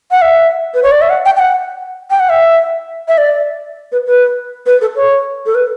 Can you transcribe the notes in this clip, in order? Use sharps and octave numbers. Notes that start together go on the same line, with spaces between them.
F#5
E5
B4
C#5
D5
E5
F#5
G5
G5
F#5
G5
F#5
E5
E5
D5
B4
B4
B4
A4
C#5
A4
B4